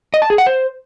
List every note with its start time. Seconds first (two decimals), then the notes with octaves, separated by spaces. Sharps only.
0.14 D#5
0.22 A5
0.30 G#4
0.38 F#5
0.46 C5